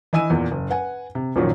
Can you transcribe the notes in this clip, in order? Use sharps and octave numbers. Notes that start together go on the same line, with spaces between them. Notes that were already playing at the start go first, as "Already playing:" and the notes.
E3 D#5 G#5 E6 D#7
E2 A#2
F#1
B4 F#5 G#5
C3
A#1 F#2 A#2 D#3 F#3